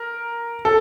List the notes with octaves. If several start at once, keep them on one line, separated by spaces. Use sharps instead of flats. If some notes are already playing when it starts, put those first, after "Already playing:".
Already playing: A#4
A4